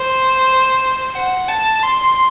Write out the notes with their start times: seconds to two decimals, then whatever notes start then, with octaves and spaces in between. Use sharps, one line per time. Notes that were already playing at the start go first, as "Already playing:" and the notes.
Already playing: C5
1.15 F#5
1.48 A5
1.83 C6